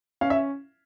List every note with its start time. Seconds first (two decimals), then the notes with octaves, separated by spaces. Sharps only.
0.21 C#4 F5
0.30 E5